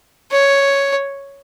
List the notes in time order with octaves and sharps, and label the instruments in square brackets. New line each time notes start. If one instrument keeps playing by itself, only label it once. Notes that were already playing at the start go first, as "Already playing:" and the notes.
[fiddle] C#5